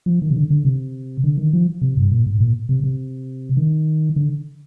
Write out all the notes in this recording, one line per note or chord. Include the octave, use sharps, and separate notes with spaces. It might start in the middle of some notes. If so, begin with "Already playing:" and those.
F3
D#3
C3
D3
D3
C3
D3
D#3
F3
C3
G2
A#2
G#2
A#2
C3
C3
D#3
D3